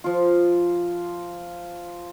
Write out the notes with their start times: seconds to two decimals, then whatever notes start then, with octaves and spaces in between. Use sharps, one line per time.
0.04 F3 F4